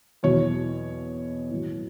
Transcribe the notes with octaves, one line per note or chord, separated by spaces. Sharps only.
E2 B2 F#3 C#5
A2 F#3